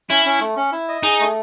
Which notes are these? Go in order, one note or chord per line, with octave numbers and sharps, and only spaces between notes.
C#4 E4
C#4
A3
C#4
E4
D#5
D#4 G#4
A3